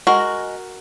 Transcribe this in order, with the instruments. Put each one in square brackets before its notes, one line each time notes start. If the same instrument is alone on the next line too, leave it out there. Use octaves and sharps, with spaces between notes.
[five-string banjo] G#3 F#4 A#4